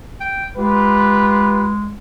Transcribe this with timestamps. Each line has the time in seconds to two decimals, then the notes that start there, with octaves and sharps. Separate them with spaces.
0.20 G5
0.56 G#3 F4 G4 B4